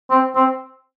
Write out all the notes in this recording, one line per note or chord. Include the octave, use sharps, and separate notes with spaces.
C4
C4